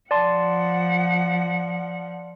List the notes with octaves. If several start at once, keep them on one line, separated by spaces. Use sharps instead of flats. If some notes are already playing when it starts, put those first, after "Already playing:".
F3 D5 F#5 A5 C6